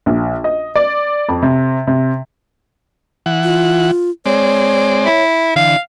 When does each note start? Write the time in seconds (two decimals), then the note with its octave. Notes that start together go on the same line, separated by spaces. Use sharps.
0.06 A#1
0.44 D#5
0.75 D5
1.29 F2
1.42 C3
1.87 C3
3.26 E3 F#5
3.43 F4
4.26 G#3 C4 C#5 D5
5.06 E4
5.56 D3 E3 F5